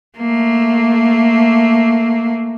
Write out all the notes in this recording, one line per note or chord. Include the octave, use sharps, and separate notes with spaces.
A3 A#3